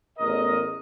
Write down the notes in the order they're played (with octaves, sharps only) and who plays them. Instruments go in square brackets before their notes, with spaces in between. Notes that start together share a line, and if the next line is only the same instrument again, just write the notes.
[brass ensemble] A1 E2 A#4 D#5